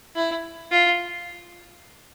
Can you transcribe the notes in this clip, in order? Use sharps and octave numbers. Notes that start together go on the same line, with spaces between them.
E4
F4